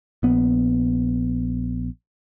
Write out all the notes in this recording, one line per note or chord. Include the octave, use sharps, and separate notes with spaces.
A#1 B3